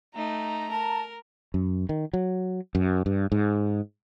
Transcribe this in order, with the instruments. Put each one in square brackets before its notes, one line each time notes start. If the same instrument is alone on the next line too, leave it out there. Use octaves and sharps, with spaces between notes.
[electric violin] A3 D#4 [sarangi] A#5
[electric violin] A#4 [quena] A5
[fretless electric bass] F#2
D#3
F#3
F#2
G2
G#2